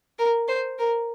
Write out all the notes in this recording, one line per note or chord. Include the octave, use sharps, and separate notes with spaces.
A#4
C5
A#4